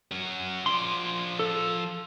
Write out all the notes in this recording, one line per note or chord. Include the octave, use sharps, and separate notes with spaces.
F#3 C#4
F3 D5 C6
A4